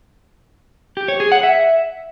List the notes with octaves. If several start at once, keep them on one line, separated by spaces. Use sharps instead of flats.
G4
C#5
G#4
F#5
E5